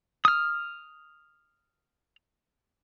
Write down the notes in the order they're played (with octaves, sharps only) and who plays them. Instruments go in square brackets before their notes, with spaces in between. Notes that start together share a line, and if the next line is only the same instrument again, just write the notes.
[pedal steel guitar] D#6 F6